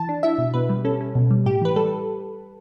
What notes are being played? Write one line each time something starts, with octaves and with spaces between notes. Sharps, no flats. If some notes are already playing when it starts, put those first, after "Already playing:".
Already playing: E3 A5
D4
E4 E5
B2
B2 B4
G3
C#4 A4
C#4
B2
G3
A2 G4
E3 B4
G3 A4